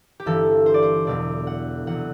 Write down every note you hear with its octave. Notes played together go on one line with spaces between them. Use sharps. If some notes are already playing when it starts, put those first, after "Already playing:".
G4
G1 G2 E3 G3 A4
C5
D5
C5
E1 E2 B2 F#3 D5
F#5
E2 C3 F#3 F#5